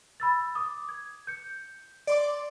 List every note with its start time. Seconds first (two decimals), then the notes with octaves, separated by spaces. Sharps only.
0.20 B5 E6 A6
0.55 D6 D#6
0.89 G#6
1.27 G6 C#7
2.07 D5 C6 D6 D7